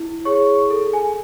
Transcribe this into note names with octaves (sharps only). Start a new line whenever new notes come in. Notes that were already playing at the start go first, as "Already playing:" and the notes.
Already playing: E4
G#4 C#5 C#6
A4
G#5